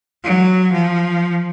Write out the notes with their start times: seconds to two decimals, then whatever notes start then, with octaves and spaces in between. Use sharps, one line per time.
0.24 F#3
0.72 F3